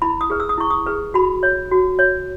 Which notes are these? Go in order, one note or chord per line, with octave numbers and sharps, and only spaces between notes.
E4 B5
D#6
G#4 B4
E6
D#6
E4 C#6
D#6
G#4 B4
F#4 B5
C#5
F#4
C#5